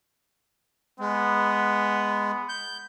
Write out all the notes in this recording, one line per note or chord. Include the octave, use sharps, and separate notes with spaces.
G#3 B3
G6